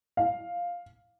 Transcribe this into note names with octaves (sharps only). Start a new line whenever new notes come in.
F5